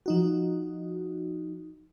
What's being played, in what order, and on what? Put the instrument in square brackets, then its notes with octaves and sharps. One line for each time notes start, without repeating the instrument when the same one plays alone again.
[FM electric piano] F3 D#4 F#4